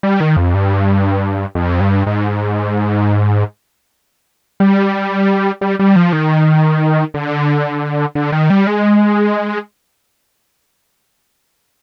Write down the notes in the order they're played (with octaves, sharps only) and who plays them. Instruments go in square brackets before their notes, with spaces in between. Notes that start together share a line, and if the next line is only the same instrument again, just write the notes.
[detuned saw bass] G3
D#3
F2
G2
F2
G2
G#2
G3
G3
G3
F3
D#3
D3
D3
D#3
G3
G#3